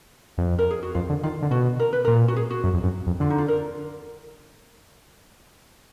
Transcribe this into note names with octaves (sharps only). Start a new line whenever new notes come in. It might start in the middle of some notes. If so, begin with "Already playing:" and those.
F2
A#4
G#4
F#4
F2 F4
D3
D#3 F4
D3
B2 F#4
A#4
B4
A#2 A#4
F#4
G#4
F#4
F#2
F2
F#2
F2
D3 F4
D#4
F4
A#4